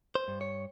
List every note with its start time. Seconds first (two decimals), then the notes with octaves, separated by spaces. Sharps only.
0.15 C5
0.28 G2
0.41 C#5